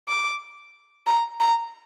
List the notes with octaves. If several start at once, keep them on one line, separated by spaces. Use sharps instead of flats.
D6
A#5
A#5